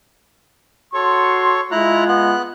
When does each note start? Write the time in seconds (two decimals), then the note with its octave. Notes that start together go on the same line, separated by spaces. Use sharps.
0.94 F#4 A4 C#5 C6 C#6
1.71 G#3 E4 F4 A#5 F#6
2.08 B3 F#6